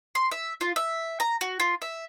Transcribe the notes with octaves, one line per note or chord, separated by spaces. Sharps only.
C6
E5
F4
E5
A#5
F#4
F4
E5